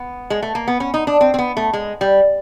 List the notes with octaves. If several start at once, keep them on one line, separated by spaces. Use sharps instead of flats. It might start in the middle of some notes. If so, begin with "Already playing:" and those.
Already playing: B3
G#3
A3
A#3
B3
C#4
D#4
D4
C4
C4
B3
A3
G#3
G3